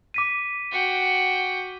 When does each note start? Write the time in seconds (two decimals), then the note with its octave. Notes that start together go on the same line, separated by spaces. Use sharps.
0.14 D6 B6 D#7
0.72 F#4 G5